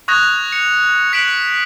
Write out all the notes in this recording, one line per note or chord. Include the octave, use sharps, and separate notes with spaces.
C#6 D#6 F#6 G#6 A#6 F7
C#7 F7
F#6 B6 C#7 D7 E7 F#7